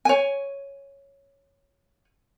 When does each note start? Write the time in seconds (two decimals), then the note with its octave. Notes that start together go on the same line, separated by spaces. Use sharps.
0.05 C#5 G#5